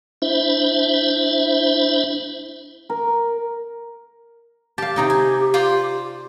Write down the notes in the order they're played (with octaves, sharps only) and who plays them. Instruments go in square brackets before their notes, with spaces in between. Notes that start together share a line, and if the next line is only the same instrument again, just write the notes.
[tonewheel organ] D4 E4 C5 E5
[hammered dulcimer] A#4
[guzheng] G4 F5 [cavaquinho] A5
[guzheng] C3 D#4 G5 [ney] G4
[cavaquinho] G#5
F4 C5 D5